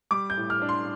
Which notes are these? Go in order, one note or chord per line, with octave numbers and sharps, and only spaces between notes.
G3 D6
G6
A2
F6
D4
C6